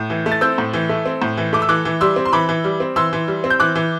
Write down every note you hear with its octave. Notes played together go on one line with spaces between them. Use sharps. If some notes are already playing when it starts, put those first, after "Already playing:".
Already playing: A2
E3
A3
A6
C4 E6 G6
A2
E3
A3
C4
A2
E3
A3 D6
E6
E3 D6 F#6
E3
G3 C6 E6
C4
C6
E3 B5 D6
E3
G3
C4
E3 C6 E6
E3
G3
C4
G6
E3 D6 F#6
E3